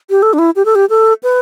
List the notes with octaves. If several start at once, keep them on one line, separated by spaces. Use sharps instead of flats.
G4
A4
D4
E4
G4
A4
G4
A4
B4